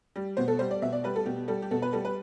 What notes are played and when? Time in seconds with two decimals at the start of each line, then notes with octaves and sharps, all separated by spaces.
0.16 G3
0.37 B2 C5
0.48 A4
0.59 G3 C5
0.71 D5
0.82 B2 E5
0.92 D5
1.04 G3 B4
1.16 A4
1.26 B2 G4
1.48 G3 A4
1.62 G4
1.71 B2 A4
1.82 B4
1.93 G3 A4
2.05 B4